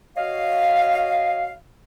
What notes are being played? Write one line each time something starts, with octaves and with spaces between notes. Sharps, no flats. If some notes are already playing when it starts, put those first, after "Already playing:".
F#4 C#5 D#5 F5